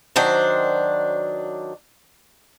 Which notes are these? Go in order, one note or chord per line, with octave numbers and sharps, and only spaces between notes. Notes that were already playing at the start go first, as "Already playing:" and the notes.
D#3 F#3 D4 C5